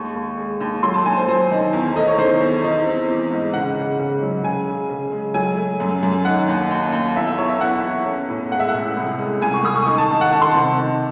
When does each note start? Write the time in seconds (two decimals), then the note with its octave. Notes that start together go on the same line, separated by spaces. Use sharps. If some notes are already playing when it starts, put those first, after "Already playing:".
Already playing: D#2 G#3 C#6
0.15 D#2
0.37 G#3
0.61 D#2
0.83 F#3 C6
0.94 A5
1.06 D#2 G#5
1.16 C5
1.28 F#3 C5
1.51 D#3
1.73 E2
1.96 A3 D#5
2.07 C#5
2.18 D#3 C5
2.40 E2
2.64 D#4
2.86 C4
3.09 E3
3.31 G#2
3.53 C#3 F#5
3.77 C#3
3.99 C#3
4.22 F#3
4.44 C#3 G#5
4.68 C#3
4.89 C#3
5.12 G#3
5.34 F#3 G#5
5.57 A3
5.80 F#2
6.03 F#2
6.25 D#3 F#5
6.48 D#2
6.71 D#2
6.92 D#2
7.15 E2 E5
7.28 E5
7.38 E2 C#5
7.49 E5
7.61 E2 F#5
7.84 E2
8.05 C#4
8.28 A2
8.51 G#3 F#5
8.60 E5
8.68 F#5
8.74 A1
8.97 C2
9.19 G#3
9.42 C2 G#5
9.53 C#6
9.64 C2 D#6
9.75 C#6
9.86 D#3 C#6
9.98 A5
10.10 D#3
10.21 F#5
10.32 D#3 A5
10.41 C6
10.51 C3 A5
10.78 D#3